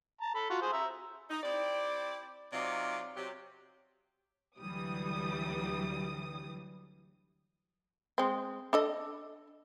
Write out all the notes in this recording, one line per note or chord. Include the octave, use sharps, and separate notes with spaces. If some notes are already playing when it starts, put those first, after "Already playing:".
A5 A#5
A4 B5
F4 F#4
G#4 C5
E5 A#5
D#4
C4 E4 G4 D5
C3 F#3 D#4 F4 D5 F5
C3 F#3 G4
D2 E3 F#3 G3 D#6
G#3 C4
D4 A4 D#5